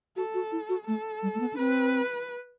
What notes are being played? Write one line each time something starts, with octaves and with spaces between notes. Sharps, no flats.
F#4 A4
F#4
E4
F#4
A3 A4
G3
A3
B3
D4
C4 B4